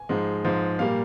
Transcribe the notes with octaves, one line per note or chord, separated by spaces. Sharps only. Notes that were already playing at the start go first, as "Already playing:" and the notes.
Already playing: G#5
G#2 F3 G#3
G#2 F3 G#3
A#2 G3 A#3 F5